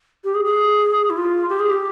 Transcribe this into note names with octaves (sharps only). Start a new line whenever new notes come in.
G4
G#4
G#4
E4
F4
G4
G#4
G4